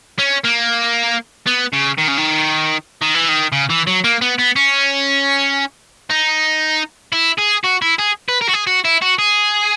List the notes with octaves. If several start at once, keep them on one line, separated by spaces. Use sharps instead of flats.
C#4
A#3
B3
C#3
D#3
C#3
D#3
D#3
E3
D#3
C#3
E3
F#3
A#3
B3
B3
C#4
D#4
E4
G#4
F#4
E4
G#4
B4
A#4
F#4
G#4
F#4
E4
F#4
G#4